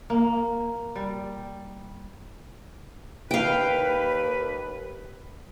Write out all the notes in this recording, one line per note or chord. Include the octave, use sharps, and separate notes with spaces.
A#3
G3
D#2 B4 F5 G5